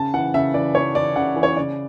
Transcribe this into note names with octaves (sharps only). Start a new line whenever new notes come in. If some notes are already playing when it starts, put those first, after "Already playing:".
Already playing: C#3 A5
E3 F#5
C#3 E5
E3 D5
C#3 C#5
E3 D5
C#3 F#5
E3
C#5
C#3 D5